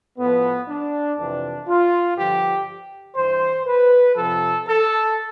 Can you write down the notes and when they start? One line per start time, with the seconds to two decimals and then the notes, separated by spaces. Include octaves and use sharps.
0.18 A2 F3 B3
0.67 D4
1.17 F2 C3 E3 D4
1.67 F4
2.17 G2 D3 F3 G4
3.16 G2 E3 C5
3.66 B4
4.15 F2 C3 F3 A4
4.65 A4